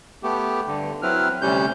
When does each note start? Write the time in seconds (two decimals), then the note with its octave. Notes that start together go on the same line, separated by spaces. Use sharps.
0.23 A3 B3 G4
0.67 G2 D3
1.02 F#3 C4 E4 B4 F6
1.42 D2 C3 G3 C#4 G6